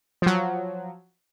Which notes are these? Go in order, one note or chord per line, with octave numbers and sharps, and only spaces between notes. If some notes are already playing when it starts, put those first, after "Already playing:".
F3 F#3